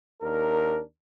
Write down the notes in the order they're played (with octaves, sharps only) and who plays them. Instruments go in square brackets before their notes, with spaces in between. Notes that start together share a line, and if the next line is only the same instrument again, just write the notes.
[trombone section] D#2 D4 A#4